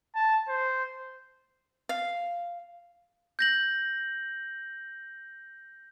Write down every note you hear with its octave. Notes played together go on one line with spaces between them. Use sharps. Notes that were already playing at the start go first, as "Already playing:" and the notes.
A5
C5
F5
G6 A#6 F#7